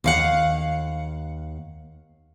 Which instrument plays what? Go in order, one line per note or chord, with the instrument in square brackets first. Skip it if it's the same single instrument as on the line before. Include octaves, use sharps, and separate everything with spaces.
[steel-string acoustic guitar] D#2 F5 F#5